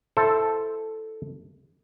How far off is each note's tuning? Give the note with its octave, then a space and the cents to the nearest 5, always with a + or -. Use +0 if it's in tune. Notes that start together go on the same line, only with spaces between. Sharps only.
E4 +0 A4 +0 C5 +0